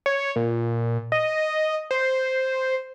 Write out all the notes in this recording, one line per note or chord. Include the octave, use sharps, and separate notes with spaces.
C#5
A#2
D#5
C5